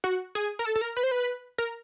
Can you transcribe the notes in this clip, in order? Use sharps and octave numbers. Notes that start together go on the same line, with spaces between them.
F#4
G#4
A#4
A4
A4
A#4
B4
C5
B4
A#4